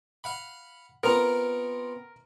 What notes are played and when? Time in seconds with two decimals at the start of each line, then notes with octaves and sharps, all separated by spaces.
0.24 F5 F#5 B5
1.03 B3 C4 F4 A#4 A#5